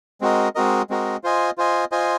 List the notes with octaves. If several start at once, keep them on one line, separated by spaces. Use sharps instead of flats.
G#3 C4 F#4 A#4 D#5
G#3 C4 F#4 A#4 D#5
G#3 C4 F#4 A#4 D#5
F4 C5 D#5 G#5
F4 C5 D#5 G#5
F4 C5 D#5 G#5